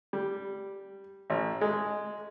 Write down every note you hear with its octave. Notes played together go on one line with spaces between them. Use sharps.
G3
A1
G#3